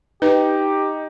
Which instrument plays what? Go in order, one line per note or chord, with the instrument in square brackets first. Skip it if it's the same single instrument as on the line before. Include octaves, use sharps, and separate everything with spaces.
[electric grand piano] D#4 [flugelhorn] G4 [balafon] B4